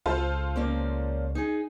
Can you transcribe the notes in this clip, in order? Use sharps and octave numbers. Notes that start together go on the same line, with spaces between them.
C#2 F4 A4 C5
A#3 C#4 D5
D#4 G#4